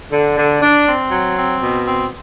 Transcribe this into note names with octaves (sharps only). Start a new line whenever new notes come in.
D3
D3
D4
C4
F#3
C4
B2
C4